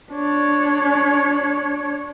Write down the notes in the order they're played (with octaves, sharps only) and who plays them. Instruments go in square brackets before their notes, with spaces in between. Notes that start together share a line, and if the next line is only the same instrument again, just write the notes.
[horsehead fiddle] D4 C#5